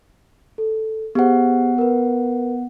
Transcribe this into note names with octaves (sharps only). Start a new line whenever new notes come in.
A4
B3 G4 G#4 C5 F#5
A#4 B4